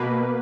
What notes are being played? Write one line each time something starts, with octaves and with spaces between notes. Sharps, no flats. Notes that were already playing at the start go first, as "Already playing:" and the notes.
Already playing: B2 A#3 B4